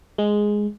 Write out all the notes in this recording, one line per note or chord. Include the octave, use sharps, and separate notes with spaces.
G#3